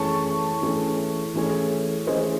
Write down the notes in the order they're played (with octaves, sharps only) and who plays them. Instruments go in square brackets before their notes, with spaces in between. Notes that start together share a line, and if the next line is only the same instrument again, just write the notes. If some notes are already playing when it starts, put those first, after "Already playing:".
Already playing: [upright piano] E3 A3 C#4 G#4 C#5 [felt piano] A5 C#6
[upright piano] E3 A3 C#4 G#4 C#5
E3 A3 C#4 G#4 C#5
[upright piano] E3 A3 C#4 G#4 C#5 [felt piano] C5 D#5